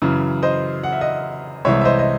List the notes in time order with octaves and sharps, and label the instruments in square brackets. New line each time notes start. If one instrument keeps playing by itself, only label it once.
[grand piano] F#2 C#3 E3
C5 D#5
F#5
E5
D#5 F#5
C2 C3 E3 G#3 C#5 E5
E5
C5 D#5
D#5